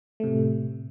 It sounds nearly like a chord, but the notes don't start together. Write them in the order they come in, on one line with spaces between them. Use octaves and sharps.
A3 C3 A2